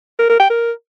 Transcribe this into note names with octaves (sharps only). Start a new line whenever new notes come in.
A#4
A#4
G5
A#4